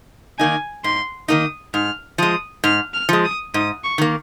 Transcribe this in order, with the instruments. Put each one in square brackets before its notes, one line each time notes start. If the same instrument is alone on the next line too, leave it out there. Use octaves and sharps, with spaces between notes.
[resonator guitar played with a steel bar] D#3 A#3 D#4 [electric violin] G#5
[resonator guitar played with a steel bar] G#2 [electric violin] C6
[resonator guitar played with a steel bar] D#3 A#3 D#4 [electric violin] D#6
[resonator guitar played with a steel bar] G#2 [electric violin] F6
[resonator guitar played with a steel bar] F3 G#3 [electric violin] D#6
[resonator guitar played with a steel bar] G#2 [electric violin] F6
[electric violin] F6
[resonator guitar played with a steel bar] F3 G#3
[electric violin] D#6
[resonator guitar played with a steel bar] G#2 [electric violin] D#6
[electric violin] C#6
[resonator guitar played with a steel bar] D#3 A#3